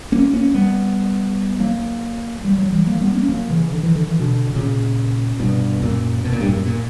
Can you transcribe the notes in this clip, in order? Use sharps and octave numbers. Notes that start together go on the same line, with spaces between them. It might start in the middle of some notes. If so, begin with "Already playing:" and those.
A#3 C#4
A#3 C#4
G3 B3
F#3 A#3
G3
F#3
E3 G3
F#3 A#3
G3 B3
A#3 C#4
F#3 A#3
C#3 E3
D3
E3
D3
E3
B2 D3
B2
A#2 C#3
G2 B2
F#2 A#2
B2
A#2
G2
F#2 A#2
A#2